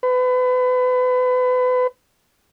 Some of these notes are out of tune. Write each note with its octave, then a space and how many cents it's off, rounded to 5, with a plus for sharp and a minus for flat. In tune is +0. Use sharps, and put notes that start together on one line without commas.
B4 +30